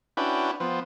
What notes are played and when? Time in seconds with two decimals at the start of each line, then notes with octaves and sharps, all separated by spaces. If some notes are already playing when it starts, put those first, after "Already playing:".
0.17 C#4 D4 E4 F#4 B4 G5
0.60 F3 B3 C4